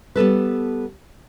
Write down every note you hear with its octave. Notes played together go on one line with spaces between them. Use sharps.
G3 B3 A4 B4